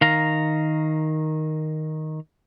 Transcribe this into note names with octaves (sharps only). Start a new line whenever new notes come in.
D#3 F5 A#5